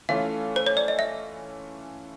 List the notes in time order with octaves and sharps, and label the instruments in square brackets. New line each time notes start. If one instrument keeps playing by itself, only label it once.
[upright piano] E3 A3 C#4 F4 [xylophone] F5
[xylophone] C5
C#5
D5
D#5
E5